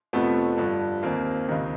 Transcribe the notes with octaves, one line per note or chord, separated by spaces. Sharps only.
F2 C3 F3 A3 B3
G2 D3 F3
D#2 D#3 A#3 C4
C#2 C3 D#3